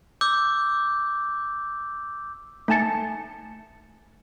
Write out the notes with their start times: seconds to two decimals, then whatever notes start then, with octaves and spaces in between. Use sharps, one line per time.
0.21 D6 E6 G6
2.68 A3 D#4 G#5 A5 A6 C#7